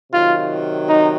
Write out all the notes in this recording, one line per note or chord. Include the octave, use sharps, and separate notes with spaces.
C3 D#3 F#3 F4
D#4